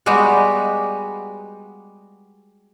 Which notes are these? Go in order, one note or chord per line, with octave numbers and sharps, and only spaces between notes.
G3 G#3 B3 F#4 G4